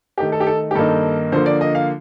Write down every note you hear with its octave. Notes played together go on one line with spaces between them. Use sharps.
D#3 A3 D#4 G4
A4
G4
A4
G4
G2 D#3 A#3 D#4 A4
D3 F3 A#3 C5
D5
D#5
F5